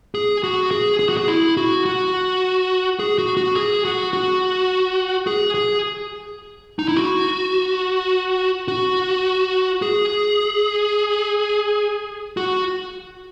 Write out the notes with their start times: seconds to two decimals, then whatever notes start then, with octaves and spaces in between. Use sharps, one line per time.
0.15 G#4
0.44 F#4
0.71 G#4
0.99 G#4
1.09 F#4
1.17 G#4
1.28 E4
1.57 F#4
1.86 F#4
2.99 G#4
3.18 F#4
3.37 F#4
3.56 G#4
3.85 F#4
4.13 F#4
5.27 G#4
5.54 G#4
6.79 D#4
6.88 E4
6.96 F#4
8.68 F#4
9.82 G#4
12.37 F#4